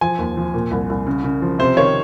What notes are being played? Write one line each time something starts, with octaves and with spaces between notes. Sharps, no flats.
F3 G#5
D#2
F3
A#2
C2
C2
C#3
C#3
F3
C3 C5
D#3 C#5